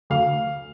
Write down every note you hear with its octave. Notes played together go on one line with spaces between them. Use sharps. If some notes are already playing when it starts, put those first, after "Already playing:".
D2 F5